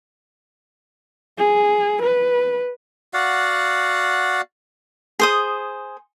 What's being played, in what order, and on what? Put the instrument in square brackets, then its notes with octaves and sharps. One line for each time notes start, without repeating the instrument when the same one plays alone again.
[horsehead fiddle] G#4
B4
[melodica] F#4 D5 F5 F#5
[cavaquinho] G#4 C5 D#6